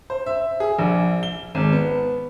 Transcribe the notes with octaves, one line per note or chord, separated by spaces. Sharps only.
C5
E5
G#4
A#1
G7
G#1
B3